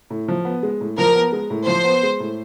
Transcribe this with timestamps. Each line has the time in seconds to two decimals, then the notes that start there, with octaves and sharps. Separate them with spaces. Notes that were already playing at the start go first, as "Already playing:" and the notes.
0.10 A2
0.28 F3
0.45 B3
0.63 G#3
0.81 A2
0.98 F3 A#4
1.15 B3
1.32 G#3
1.50 A2
1.67 F3 C5
1.84 B3
2.03 G#3
2.20 A2